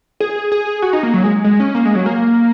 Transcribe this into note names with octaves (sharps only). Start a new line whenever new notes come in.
G#4
G#4
F#4
D#4
A#3
F#3
G#3
G#3
C#4
A#3
G#3
F#3
A#3